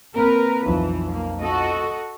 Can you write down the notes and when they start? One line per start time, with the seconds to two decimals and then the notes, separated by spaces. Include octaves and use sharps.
0.16 A#3 C4 A#4 B4
0.66 B1 F2 E3
1.12 A#3
1.42 F#4 A4 D#5